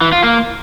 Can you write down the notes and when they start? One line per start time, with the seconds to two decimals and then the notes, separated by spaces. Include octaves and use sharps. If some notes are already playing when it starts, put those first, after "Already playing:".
0.01 E3
0.12 F4
0.24 A#3